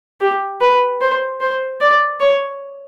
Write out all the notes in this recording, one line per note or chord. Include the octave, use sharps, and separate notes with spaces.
G4
B4
C5
C5
D5
C#5